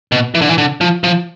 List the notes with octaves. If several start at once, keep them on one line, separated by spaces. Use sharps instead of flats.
B2
E3
D3
E3
D3
F3
F3